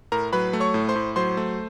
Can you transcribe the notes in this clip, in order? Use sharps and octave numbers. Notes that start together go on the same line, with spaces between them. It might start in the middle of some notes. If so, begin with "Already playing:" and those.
A2 A#4 A#5
F#3 B4 B5
A3
C#5 C#6
A2
C5 C6
A2
F#3 C5 C6
A3